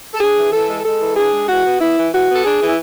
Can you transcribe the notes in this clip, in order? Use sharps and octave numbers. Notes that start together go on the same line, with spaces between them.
A4
D4 G#4
E3
E3 A4
G#3
G#3 A4
E3
D4 G#4
G#3
E3 F#4
B3
B3 E4
E3
E3 F#4
B3
A4
D4 G#4
E3
E4